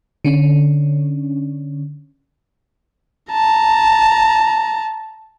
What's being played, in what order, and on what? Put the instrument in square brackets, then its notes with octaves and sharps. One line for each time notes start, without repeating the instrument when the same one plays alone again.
[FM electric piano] D3 C#4
[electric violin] A5 A#5